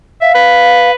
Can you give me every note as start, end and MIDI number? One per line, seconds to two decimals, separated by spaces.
0.22 0.32 76
0.22 0.91 77
0.35 0.95 71